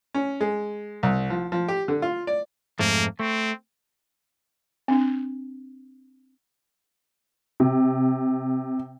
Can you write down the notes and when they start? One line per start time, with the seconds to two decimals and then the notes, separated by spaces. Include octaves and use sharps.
0.14 C#4
0.41 G#3
1.03 C2
1.30 F3
1.52 F3
1.68 G4
1.88 D3
2.02 F4
2.27 D5
2.79 F2 G#2 A3 A#3
3.20 A3 C4
4.88 C4 D4
7.60 C3